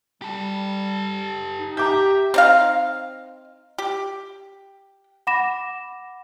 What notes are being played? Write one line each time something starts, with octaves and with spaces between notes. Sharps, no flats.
G3 G4 A4
D#4
G4 E5 A#5 D6 G6
C4 D#4 F5
G4
F#5 B5 D6 A#6 E7